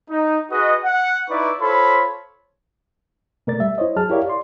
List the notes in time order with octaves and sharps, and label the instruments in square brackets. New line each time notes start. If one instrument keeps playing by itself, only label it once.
[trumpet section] D#4
F#4 G#4 B4 D#5
F#5
D#4 E4 B4 D5 C#6
F4 A4 C5 C#5 B5
[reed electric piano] B2 A3 A#4 D5 A6
G3 E5
E4 C5 C#5 D#5
F#3 G#4 A5 F6
E4 G4 A#4 C#5 D5 F5
D5 C6